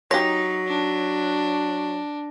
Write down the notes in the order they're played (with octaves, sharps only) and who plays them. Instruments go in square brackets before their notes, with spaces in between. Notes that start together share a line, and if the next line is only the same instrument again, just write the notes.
[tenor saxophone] F#3 [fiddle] D#4 [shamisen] G4 C#5 [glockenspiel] A#6
[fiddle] D4